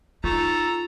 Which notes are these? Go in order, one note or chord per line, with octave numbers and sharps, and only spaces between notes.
D#4 F4 A4 A#5 C#6